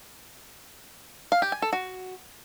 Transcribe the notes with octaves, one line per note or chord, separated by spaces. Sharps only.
F5
G4
G#5
A4
F#4